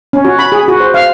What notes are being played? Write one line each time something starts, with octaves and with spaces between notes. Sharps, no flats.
C#4
F#4
B5
G#4
F#4
C5
F5